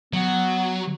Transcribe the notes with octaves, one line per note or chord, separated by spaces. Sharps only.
F#3 B3